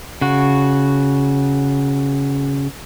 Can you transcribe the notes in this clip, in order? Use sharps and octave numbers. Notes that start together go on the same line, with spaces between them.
C#3 F#4